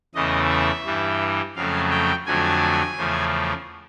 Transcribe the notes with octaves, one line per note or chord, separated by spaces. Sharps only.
E2 C#3 E3 A3 D#5
E5
G2 E3 G3
F2 C#3 F#3 A3 F5
G5
F2 D3 F#3 A3 G#5
E2 C#3 F3 A3